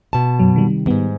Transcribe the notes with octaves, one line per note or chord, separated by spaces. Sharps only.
B2 A5
F#2 F#3
C3 D#3 G3
F2 G#2 D#3 G3 B3